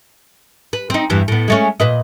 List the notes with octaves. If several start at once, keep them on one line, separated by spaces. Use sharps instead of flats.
B4
C4 D#4
E2 G2 E3
A2 B3
G#3 A3 C#4
A#2 B4 D#5